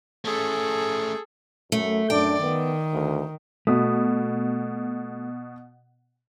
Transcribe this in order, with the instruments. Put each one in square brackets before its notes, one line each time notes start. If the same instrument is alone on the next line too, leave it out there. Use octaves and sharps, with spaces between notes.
[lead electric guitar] A3 C#4 [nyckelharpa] G#4 A4
[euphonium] F#2 [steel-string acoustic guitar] A3
[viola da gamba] F#2 D5 [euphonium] D4 [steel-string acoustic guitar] G5
[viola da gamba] D#3 [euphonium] B3
[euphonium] D2
[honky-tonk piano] B2 D#6 [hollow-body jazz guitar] A3